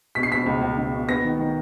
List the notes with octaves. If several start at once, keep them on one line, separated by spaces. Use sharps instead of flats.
B2 B6
C7
B2 B6
C#2
C#2
C#2
B2
B3 A#6
D#3
D#3